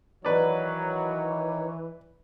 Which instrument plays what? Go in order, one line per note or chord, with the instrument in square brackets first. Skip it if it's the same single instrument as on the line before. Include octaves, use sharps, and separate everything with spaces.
[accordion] D#3 D#4 C#5 [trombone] E3 [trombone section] F#3 [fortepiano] B4 D5